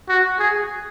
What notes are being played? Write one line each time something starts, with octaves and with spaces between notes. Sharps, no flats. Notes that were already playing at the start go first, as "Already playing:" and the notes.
F#4
G#4